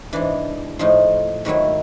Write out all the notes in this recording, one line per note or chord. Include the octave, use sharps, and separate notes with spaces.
G#2 E3 D4
A2 F3 D#4
G#2 D#3 F#3 E4